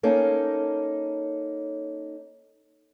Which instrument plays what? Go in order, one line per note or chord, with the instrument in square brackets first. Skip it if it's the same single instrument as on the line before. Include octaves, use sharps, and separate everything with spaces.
[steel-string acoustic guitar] A#3 C#4 D#4 A4